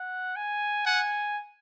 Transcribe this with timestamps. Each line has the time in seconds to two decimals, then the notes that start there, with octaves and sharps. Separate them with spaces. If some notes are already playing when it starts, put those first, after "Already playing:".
Already playing: F#5
0.36 G#5
0.86 F#5 G#5